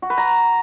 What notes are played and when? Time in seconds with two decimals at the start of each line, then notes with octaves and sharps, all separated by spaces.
0.02 F#4
0.10 B4
0.18 A#5